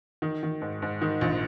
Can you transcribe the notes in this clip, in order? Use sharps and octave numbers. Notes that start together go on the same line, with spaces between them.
D#3
D#3
G#2
G#2
D#3
A#1